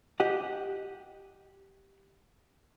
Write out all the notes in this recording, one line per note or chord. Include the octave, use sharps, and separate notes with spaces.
G4 D#5 F#5